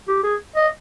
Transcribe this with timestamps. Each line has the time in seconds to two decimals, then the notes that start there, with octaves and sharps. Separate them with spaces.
0.08 G4
0.24 G#4
0.56 D#5